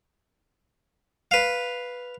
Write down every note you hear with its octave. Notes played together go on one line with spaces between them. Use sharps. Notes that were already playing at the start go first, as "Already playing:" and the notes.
B4 F5